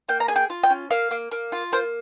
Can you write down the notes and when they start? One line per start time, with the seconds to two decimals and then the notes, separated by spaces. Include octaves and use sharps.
0.09 A#3 G5
0.20 A#5
0.28 G#4 G#5
0.36 G5
0.50 F4
0.63 G5
0.70 C#4
0.90 A#3 F5
1.11 A#3
1.31 A#3
1.52 F4
1.72 A#3 C5